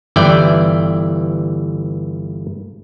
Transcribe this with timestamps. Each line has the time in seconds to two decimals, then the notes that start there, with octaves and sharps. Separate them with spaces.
0.16 G1 E3 E4 D5 G5